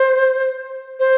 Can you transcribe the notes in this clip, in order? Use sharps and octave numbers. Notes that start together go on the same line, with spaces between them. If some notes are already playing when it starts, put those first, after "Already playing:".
Already playing: C5
C5